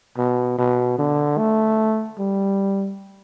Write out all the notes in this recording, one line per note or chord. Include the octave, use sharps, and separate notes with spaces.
B2
B2
D3
A3
G3